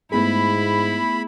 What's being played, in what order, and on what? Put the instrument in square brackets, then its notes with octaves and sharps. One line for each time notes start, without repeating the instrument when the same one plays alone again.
[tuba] G#2 [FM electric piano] A3 B3 G#4 [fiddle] E4 [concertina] B5